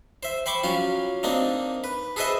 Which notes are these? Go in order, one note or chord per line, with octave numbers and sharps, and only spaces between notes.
C5 E5
C5 G5 B5 C#6 D6
F#3 C#4 F4
A#3 C4 D4 D#4
B4
G#4 A4 B4 C5 D#5 E5